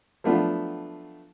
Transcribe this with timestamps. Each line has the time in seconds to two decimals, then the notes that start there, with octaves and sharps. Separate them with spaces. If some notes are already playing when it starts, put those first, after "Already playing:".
0.24 F3 F#3 A3 B3 D4 F4